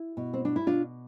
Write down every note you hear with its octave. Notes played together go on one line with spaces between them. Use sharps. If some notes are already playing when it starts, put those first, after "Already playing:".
Already playing: E4
B2
C4
D4
E4
B2 D4 F4